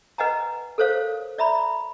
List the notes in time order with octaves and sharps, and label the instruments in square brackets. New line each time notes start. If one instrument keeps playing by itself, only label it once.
[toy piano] B4 D#5 F#5 G#5 A#5
A4 A#4 C5 C#5 F5
D5 E5 A#5 B5